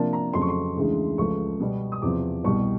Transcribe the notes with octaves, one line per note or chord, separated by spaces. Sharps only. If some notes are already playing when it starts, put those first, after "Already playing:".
Already playing: C3 F3 A#3 D4 A5
A#5
F2 C#3 F#3 A3 C6
C#6
C6
D2 C#3 E3 G#3
C#2 C#3 F3 A3 C#6
B2 G3 B3
D#6
E2 C3 F3 D6
C2 B2 G3 C#6